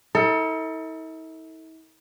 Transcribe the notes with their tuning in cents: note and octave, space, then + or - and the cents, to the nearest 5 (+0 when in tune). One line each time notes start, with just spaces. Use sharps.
E4 -45 A4 +30